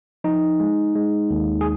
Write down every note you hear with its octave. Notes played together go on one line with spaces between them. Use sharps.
F3 D#4
G#3
G#3
D#2
G#4